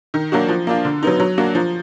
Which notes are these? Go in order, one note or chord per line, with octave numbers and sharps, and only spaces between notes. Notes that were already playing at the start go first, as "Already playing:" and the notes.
D#3
F#3 A#3 D4 F#4
F3
A#3 D4 F4
D3
F#3 B3 D#4
F#3
A#3 D4 F#4
F3